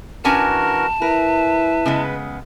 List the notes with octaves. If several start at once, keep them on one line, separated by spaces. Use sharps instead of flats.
E3 C#4 D4 F#4 A#4 G#5 A5
E4 A#4 B4
C#3 G#3 B3